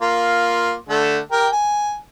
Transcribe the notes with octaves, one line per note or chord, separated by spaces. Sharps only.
A#3 F4
D3 A3
G4 A#4 G5
G#5